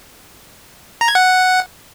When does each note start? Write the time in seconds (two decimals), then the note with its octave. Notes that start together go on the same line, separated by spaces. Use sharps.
1.01 A#5
1.08 G#6
1.15 F#5